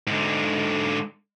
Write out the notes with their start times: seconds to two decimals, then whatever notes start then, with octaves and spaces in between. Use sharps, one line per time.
0.07 G#2 D3